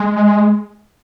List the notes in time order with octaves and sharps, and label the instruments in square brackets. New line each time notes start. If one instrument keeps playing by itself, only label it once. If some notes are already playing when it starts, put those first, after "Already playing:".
Already playing: [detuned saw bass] G#3